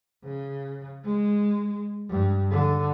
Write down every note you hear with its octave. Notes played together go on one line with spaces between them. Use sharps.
C#3
G#3
G2
D3